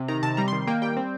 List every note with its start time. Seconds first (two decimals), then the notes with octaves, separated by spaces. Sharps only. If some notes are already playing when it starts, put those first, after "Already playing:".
Already playing: C3
0.08 D#3 A#5
0.23 C3 A5
0.37 G3 A#5
0.48 C6
0.52 D#3
0.67 A#3 G5
0.82 G3 G5
0.97 C4